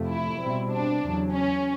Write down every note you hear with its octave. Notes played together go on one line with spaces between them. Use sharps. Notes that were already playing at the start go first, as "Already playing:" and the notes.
Already playing: F2 C3 F3 A3
E4
B2 G3 C4
D4
E2 C#3 F#3
C#4